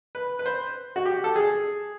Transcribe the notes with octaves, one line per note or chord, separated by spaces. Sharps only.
B4
B4
C5
F#4
G4
A4
G#4